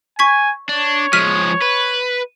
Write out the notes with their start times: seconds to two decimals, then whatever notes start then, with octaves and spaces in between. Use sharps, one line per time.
0.19 G#5 C#6 G#6 B6
0.69 D4 C#5
1.13 F3 G#3 F6 B6 D#7
1.61 B4